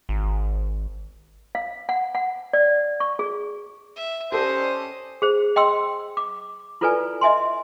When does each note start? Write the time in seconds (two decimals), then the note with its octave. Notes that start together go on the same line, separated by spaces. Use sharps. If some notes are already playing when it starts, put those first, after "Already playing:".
0.09 G#1
1.55 F5
1.89 F#5
2.15 F#5
2.53 D5
3.00 C#6
3.19 G#4
3.96 E5
4.32 C#4 G4 A4 C5 D5 D#5
5.22 G#4 C5
5.56 D#5 G5 C6 E6
6.17 D6
6.81 E4 F4 A4 B4 D5 G#5
7.21 D#5 E5 G#5 C6